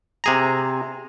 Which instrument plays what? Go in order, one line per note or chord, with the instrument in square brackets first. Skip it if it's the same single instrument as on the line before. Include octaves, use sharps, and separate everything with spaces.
[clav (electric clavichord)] C3 G#4 A#5